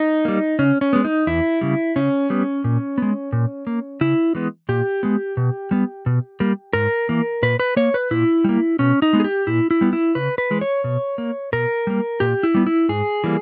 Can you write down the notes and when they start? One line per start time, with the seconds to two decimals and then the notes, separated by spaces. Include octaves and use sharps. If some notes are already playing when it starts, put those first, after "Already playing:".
Already playing: D#4
0.25 G3 A#3
0.59 C#3 C#4
0.81 C#4
0.93 G#3 B3
1.05 D#4
1.27 E2 E4
1.61 C#3 G3
1.96 C#3 C#4
2.30 G3 B3
2.64 A#2
2.98 G#3 B3
3.33 A#2
3.67 A#3
4.01 C#3 E4
4.35 E3 G#3 B3
4.69 A#2 G4
5.03 G#3 B3
5.37 B2
5.71 G3 B3
6.06 B2
6.40 G3 A#3
6.73 G#2 A#4
7.09 E3 A#3
7.43 A#2 B4
7.60 B4
7.76 A#3 C#5
7.94 B4
8.11 A#2 E4
8.44 G3 A#3
8.79 B2 C#4
9.02 D#4
9.13 G#3 B3
9.20 G#4
9.24 G4
9.47 A#2 E4
9.71 E4
9.81 G3 B3
9.93 E4
10.15 C#3 B4
10.38 B4
10.50 E3 G#3
10.61 C#5
10.84 B2
11.18 A#3
11.53 B2 A#4
11.87 G3 A#3
12.20 A#2 G4
12.43 E4
12.54 G3 B3
12.67 E4
12.89 G#2 G#4
13.24 E3 G3 A#3